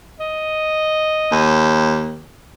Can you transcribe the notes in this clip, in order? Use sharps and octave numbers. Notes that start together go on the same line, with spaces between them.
D#5
D#2